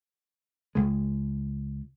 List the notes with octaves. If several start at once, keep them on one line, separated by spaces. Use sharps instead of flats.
C#2 G#3